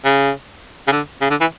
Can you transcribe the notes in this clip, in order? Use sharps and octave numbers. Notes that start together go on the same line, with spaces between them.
C#3
C#3
D3
C#3
D3
E3